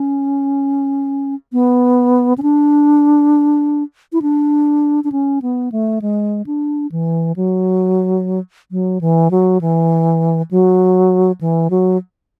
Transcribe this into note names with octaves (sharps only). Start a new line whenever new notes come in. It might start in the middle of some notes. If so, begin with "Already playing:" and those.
Already playing: C#4
B3
C#4
D4
E4
D4
D4
C#4
B3
A3
G#3
D4
E3
F#3
F#3
E3
F#3
E3
F#3
E3
F#3